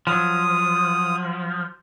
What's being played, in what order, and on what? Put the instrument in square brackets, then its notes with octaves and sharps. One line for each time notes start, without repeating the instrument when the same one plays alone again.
[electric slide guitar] F3 F#3 [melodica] D#6